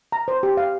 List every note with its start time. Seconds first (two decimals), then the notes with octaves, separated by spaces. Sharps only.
0.12 A#5
0.28 C5
0.43 G4
0.57 F5